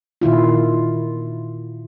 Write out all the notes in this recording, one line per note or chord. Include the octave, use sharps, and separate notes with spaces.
A#2 D#3 E4 F4